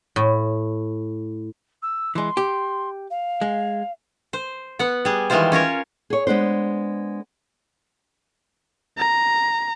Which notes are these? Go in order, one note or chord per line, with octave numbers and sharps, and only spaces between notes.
A2
E6
E3 G#3 C6
G4
F5
G#3
C5
B3 F#5
G3 G#4
D#3 E3 G3 G#3 F4 C5
C#4 F4 A#4 C#5
G#4 C#5
G#3 B3 D4 C5
A#5